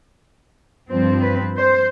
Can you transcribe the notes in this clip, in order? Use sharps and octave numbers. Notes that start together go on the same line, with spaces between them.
G2 F3 C4
B4
C5